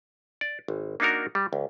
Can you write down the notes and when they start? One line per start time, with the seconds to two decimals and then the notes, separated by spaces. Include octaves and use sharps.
0.41 D5
0.68 G#1
1.00 A#3 D4 D#4 F#4 A#4
1.35 G3
1.53 C#2